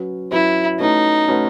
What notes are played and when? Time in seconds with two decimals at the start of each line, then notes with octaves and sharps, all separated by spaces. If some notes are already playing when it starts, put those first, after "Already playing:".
Already playing: F#3 C#4 F#4 B4
0.32 F#3 C#4 E4 F#4 B4
0.79 A3 C#4 D#4 F#4 B4
1.28 A3 C#4 F#4 B4